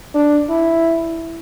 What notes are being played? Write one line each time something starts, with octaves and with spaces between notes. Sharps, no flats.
D4
E4